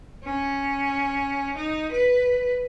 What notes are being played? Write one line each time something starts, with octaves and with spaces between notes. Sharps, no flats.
C#4
D#4
B4